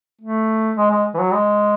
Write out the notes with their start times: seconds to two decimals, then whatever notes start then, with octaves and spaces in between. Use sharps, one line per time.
0.21 A3
0.77 G#3
0.91 G#3
1.14 E3
1.19 F#3
1.33 G#3